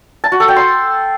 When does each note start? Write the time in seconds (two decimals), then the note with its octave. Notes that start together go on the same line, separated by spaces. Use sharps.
0.24 A5
0.32 F#4
0.40 A4
0.48 G5
0.56 C6